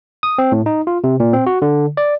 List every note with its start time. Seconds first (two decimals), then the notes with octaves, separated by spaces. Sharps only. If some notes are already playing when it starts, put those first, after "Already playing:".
0.23 D#6
0.38 C4
0.52 A2
0.66 D#4
0.87 F4
1.04 C3
1.20 A#2
1.33 C4
1.47 F#4
1.62 D3
1.97 D5